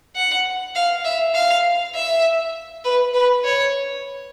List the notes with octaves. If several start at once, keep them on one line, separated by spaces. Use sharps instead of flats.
F#5
F5
E5
F5
E5
B4
B4
C#5